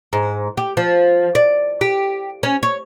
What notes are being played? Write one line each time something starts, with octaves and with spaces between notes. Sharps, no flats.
G#2
G4
F3
D5
G4
C#4
C#5